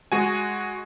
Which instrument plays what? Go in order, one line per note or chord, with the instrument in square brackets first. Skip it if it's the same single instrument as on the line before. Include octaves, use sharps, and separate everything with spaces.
[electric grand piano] G#3 F#4 G#5